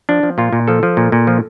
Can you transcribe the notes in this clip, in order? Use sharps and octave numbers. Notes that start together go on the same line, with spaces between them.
F3 D4
F3
A#2 F4
A#2
F3 A4
F3
A#2
A#2
F3